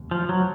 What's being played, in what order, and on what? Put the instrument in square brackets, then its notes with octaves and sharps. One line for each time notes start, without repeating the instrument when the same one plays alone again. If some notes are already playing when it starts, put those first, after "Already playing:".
Already playing: [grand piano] F1 D#2
[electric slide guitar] F3
F#3